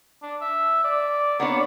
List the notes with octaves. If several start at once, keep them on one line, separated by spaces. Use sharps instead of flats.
D4
E5
D5
A#3 B3 D4 C#5